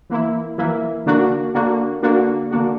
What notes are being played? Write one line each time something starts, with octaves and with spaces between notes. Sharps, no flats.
E3 A#3 E4
E3 A#3 E4
D3 A#3 D4 F#4
D3 A#3 D4 F#4
D3 A#3 D4 F#4
D3 A#3 D4 F#4